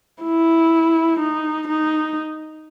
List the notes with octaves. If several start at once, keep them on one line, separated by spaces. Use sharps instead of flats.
E4
D#4
D#4